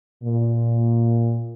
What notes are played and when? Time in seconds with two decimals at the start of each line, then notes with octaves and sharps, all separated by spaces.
0.24 A#2